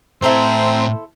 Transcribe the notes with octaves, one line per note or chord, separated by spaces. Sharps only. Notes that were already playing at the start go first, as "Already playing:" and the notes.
A2 C4 E4 A4 C5 A#5